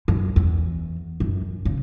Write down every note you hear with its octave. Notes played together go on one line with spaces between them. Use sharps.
F#2
E2
F#2
C#3